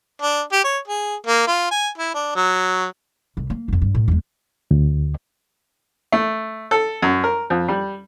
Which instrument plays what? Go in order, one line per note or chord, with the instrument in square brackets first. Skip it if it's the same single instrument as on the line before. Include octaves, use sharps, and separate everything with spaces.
[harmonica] D4
G4
C#5
G#4
A#3
F4
G#5
E4
D4
F#3
[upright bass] C2
A#3
E1 F2
G2
A2
E2 G#3
[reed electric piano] D2
[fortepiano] A3
A4
F#2
A#4
F2
G3